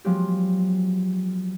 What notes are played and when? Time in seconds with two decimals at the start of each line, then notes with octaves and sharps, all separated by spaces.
0.04 F3 F#3 G#3 B3 G4